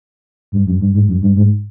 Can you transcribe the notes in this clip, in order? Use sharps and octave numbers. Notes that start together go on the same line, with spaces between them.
G2
F#2
G2
G#2
F#2
G2
G#2